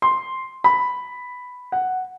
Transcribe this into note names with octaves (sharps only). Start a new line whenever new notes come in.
C6
B5
F#5